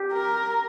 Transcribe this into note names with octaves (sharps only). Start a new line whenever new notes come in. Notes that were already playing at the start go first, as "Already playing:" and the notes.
Already playing: G4
A#4